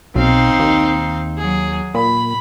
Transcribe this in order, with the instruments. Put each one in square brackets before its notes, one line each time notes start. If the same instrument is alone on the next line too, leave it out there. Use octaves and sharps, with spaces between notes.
[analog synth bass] B1 [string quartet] C4 D#4 F5
[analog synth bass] D#2
[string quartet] F#3 G#4
[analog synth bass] A#2 [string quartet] B5